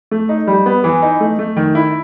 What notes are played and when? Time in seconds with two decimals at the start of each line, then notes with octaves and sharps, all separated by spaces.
0.11 A3
0.29 D#4
0.47 G3
0.66 B3
0.84 E3
1.02 D#4
1.20 A3
1.39 A3
1.56 D#3
1.75 E4